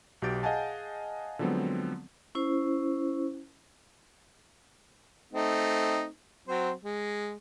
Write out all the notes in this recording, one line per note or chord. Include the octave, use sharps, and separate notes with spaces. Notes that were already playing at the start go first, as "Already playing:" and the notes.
B1 B2 G4 G6 A6 D7
G#4 D#5 F5 F#5 G#5 A5
D3 F3 F#3 G#3 B3 C4
C#4 E4 C5
A3 C4 D#4
F#3 C4 C5
G#3